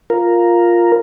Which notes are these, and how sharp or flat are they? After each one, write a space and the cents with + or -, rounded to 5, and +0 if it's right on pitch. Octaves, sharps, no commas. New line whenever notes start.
F4 +0 A#4 +0